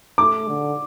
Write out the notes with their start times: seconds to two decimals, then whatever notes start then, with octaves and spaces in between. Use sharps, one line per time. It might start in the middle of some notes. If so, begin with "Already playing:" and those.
0.18 A3 D6
0.48 D3